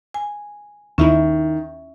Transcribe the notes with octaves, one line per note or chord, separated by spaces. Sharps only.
G#5
D#2 D#3 C#4 D#4 E4 E5